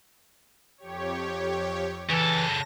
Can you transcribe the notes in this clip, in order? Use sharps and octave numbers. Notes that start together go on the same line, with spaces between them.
F2 G4 C#5
C#3 E3 A4 A#6